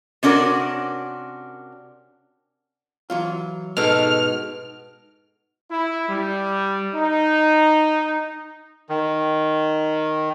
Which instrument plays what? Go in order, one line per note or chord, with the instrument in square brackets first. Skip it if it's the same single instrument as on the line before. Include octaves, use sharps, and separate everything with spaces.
[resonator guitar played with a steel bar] C3 C#4 D4 F#4 A#4
[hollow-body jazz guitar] E3 F#3 F4
[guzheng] G#2 B2 [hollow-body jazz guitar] G#3 G#4 A4 [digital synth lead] F6
[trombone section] E4
G3
D#4
[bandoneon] D#3